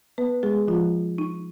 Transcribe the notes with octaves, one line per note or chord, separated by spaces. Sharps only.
B3 B4
G#3 G#4
F3 F4
D#4